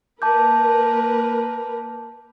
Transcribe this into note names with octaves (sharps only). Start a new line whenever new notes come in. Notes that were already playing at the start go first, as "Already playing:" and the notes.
A#3 A#4 B4 A5 D6 G6